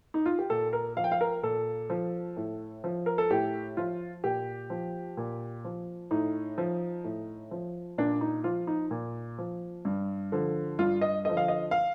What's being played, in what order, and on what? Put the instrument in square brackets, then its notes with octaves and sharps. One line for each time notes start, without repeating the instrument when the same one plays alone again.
[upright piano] D#4
F4
G4
A#2 A4
A#4
F3 F5
G5
F5
A#4
A#2 A4
F3
A2
F3
A#4
A4
A2 G4
F3 F4
A#2 G4
F3
A#2
F3
A2 D#4
F3
A2
F3
A#2 D4
D#4
F3 F4
D#4
A#2
F3
G2
D3 F3
G2 F4
D#5
D3 F3 D#5
F5
D#5
F5